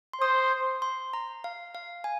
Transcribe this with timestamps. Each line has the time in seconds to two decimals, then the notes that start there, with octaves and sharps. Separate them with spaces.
0.13 C6
0.21 C5 D#6
0.82 C6
1.13 A#5
1.44 F5
1.75 F5
2.04 G#5